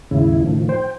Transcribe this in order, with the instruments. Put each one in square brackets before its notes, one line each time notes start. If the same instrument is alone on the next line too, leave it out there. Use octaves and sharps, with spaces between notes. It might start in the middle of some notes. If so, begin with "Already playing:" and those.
[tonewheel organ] D#2 G#2 E4 [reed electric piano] C#3
[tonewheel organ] A2 D#3 F3
[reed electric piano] C5 [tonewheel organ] G5